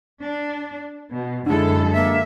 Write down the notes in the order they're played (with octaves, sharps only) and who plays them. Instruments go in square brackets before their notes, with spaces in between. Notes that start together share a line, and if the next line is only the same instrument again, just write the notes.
[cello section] D4
B2
[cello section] F#2 A4 [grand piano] D3 G#3 [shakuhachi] E4
[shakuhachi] A#3 [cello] E5